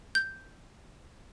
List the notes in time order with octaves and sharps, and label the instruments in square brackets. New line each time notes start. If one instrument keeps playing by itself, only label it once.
[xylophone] G6